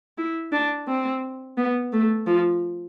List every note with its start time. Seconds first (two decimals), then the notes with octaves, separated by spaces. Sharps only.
0.18 E4
0.52 D4
0.88 C4
1.57 B3
1.93 A3
2.27 F3